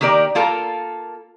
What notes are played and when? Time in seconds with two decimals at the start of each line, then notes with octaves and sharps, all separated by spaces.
0.01 D#3 A#3 G4 A#4 D5
0.35 A#3 F4 A4 A#4